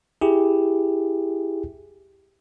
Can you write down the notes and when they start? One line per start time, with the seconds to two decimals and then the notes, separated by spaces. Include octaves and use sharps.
0.21 E4 G4 G#4